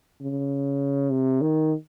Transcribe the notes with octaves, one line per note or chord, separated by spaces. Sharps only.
C#3
C3
D#3